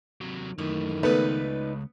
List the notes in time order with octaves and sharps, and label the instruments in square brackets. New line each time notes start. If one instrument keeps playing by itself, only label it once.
[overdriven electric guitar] C3 F#3
[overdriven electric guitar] F#2 E3 [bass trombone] D#3 [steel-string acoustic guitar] A3
[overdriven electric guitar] C#2 [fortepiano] A3 B3 [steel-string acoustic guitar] D#4 B4 D5